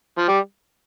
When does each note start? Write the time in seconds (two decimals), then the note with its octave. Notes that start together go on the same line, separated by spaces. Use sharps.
0.18 F3
0.28 G3